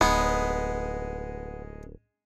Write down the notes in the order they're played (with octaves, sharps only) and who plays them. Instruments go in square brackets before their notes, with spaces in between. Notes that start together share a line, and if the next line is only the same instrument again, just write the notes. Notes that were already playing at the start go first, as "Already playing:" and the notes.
[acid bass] D1 [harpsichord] G#3 D#4 [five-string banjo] B3